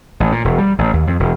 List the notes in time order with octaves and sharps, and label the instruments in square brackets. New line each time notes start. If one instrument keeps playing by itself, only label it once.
[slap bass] A1
A#2
E1
G3
A1
D#2
F2
E1